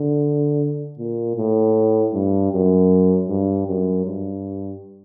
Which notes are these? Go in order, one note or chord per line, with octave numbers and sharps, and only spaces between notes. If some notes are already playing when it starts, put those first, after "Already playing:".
Already playing: D3
A#2
A2
G2
F#2
G2
F#2
G2